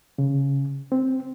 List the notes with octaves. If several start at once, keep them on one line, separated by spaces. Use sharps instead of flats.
C#3
C4